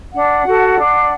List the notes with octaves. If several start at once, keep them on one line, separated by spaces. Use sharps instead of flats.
D4 F#5
F#4 A4
D4